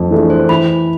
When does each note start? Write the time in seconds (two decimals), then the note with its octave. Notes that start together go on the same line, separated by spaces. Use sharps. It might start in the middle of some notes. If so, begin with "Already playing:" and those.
Already playing: F2 A3
0.11 E3 A3 D4 G#4
0.30 C5
0.49 E3 B5